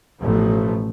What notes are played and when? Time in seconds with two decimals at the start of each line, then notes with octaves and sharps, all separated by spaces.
0.21 A1 B2 F3 A3